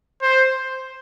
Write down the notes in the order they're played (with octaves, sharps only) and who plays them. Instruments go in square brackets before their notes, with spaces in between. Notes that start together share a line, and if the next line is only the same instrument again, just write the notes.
[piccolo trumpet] C5